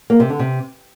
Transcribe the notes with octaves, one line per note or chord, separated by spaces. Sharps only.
A#3
C3
D3
C3